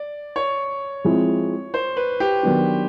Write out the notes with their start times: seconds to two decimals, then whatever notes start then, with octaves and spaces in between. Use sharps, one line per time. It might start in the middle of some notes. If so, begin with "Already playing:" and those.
Already playing: D5
0.36 C#5
1.04 F3 G#3 C4 E4
1.74 C5
1.97 B4
2.20 G4
2.43 D#3 F#3 B3 D4